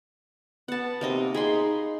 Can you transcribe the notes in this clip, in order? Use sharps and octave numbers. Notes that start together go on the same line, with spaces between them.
B3 F#5 A5
C3 A#3 D#4 D#5
D#4 G#4 B5 C6